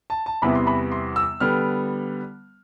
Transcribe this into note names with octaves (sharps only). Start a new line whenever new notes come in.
A5
A5
E2 C3 E3 G3 B3 B5
C6
B5
C6
E6
D3 G3 B3 F6